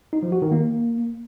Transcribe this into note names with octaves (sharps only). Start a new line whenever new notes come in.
D#4
F3
F#4
D#3
A#3